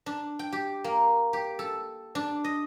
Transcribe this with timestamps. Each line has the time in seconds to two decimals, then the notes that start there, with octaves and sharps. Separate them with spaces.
0.06 D4
0.39 G5
0.53 G4
0.84 A#3
1.33 G4
1.59 A4
2.15 D4
2.44 D#5